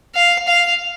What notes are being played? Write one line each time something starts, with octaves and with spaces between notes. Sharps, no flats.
F5
F5